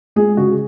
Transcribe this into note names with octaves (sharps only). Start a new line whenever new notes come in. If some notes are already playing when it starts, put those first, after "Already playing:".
G#3 G#4
C#3 F#4